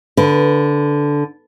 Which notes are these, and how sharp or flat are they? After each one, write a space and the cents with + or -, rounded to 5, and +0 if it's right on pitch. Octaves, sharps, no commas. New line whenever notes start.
D3 -10 B4 +0